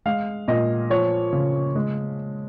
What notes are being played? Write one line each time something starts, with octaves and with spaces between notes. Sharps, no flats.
G#3 F5
A#2 D#5
F3 C#5
C#3
G#3